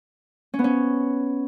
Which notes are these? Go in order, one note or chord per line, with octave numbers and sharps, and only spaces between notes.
C#4
B3
C#4